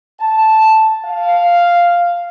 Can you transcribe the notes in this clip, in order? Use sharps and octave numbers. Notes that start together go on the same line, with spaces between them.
A5
F5